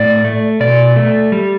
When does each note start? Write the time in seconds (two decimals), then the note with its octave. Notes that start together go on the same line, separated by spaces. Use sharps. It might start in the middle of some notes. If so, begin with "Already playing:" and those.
Already playing: A2 D5
0.24 A3
0.60 B2 D5
0.96 A3
1.32 G3